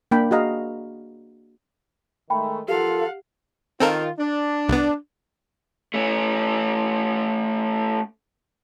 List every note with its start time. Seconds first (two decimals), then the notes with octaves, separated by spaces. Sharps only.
0.11 A#3 D4 G5 B5
0.31 F#4 G#4 D#5 F5 A#5
2.30 D#3 G#3 A3 G5 B5
2.68 F3 F4 G4 A4 A#4 F5 F#5
3.80 D#3 C4 F4 A4 A#4
4.18 D4
4.69 C2 B3
5.94 A3 C#4